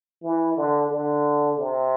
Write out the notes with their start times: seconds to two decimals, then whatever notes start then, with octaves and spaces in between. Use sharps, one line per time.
0.23 E3
0.57 D3
0.91 D3
1.59 C3